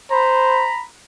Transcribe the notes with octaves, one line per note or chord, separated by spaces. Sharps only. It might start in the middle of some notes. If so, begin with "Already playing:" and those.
C5 A#5 B5